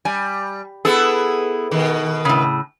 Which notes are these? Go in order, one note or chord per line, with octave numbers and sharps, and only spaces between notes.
G3 G#5
B3 E4 G#4 A4
B2 D#3
A2 C#3